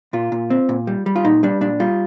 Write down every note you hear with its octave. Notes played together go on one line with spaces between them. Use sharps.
A#2 F4
A#2
C4
A#2
G3
G3
F4
A#2 D#4
G3 D4
A#2 D4
G3 F4